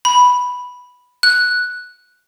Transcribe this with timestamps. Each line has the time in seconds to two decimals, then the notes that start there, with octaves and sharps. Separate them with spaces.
0.05 B5
1.23 F#6